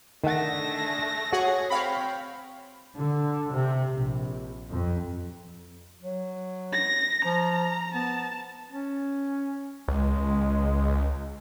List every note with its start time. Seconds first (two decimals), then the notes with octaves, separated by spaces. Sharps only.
0.24 D3 D#3 A3 D4 G#4 F#5 A#6
1.33 F#4 G#4 C#5 F#5
1.70 C4 C#5 F5 G5 B5
2.96 D3
3.52 C3
3.93 A#1
4.70 F2
6.03 F#3
6.73 A#6
7.25 F3 A#5
7.94 B3 A5
8.71 C#4
9.88 C#2 G#3